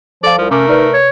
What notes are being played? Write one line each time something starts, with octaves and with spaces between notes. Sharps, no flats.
F3 A4 D5 F5
C2 F3
C3 A3 C#4 A#4 D6
D#4 B4 D5 F6
C#5